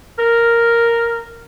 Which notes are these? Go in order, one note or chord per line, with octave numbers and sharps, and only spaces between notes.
A#4